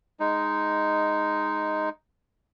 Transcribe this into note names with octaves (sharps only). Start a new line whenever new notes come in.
G#3 D#4